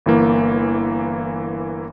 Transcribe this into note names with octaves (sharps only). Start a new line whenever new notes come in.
G1 E3 A#3